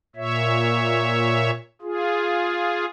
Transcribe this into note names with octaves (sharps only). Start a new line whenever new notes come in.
A#2 C#5 E5
F4 G#4